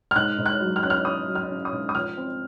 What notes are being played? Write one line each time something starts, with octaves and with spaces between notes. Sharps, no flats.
F6
G#2 F#6
G#2
F#6
F#3
F6
C#4 F#6
F6
C#4 D#6
F#3
F6
C#4
D#6
G#2
D#6
F3 F6
C4